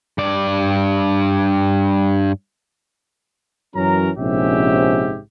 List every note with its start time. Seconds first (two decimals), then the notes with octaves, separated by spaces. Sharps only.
0.18 G2 D5
3.75 F#2 E3 F#3 C#4 A#4 A#5
4.18 A#1 G#2 C3 C#4 G4 E5